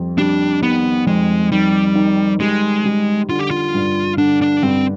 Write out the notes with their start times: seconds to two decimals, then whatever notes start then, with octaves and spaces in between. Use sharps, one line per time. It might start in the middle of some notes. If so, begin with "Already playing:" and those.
Already playing: F2 G3
0.18 G3 D4
0.62 D#3 B3
1.07 F2 G#3
1.52 D#3 G3
1.95 D#3
2.40 G3 G#3
2.84 G3
3.29 D3 F4
3.39 G4
3.51 F4
3.75 G2
4.18 D3 D4
4.42 D4
4.63 G2 C4